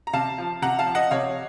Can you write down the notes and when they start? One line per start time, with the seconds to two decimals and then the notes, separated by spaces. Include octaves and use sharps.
0.07 A#5
0.13 C3 F5 A5
0.38 F3
0.62 C3 F#5 A#5
0.79 F5 A5
0.86 F3
0.95 D#5 F#5
1.11 C3 C#5 F5